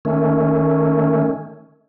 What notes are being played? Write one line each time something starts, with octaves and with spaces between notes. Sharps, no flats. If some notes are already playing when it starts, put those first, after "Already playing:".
D#3 A3 C#4